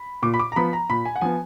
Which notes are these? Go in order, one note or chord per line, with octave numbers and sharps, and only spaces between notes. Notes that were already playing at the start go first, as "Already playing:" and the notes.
Already playing: B5
A#2 D6
B5
D6
A#5
F3 B3 B5
A#5
A#2 B5
G#5
F#5
F3 B3 G#5